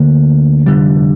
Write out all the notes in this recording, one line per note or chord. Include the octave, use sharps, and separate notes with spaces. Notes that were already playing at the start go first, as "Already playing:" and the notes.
Already playing: D2 D3 A#3
F1 D#2 D3 G3